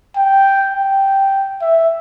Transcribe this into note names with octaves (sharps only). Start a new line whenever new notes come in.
G5
G5
E5